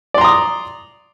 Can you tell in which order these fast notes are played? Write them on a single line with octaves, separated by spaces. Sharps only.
D5 C6 A#5 D#6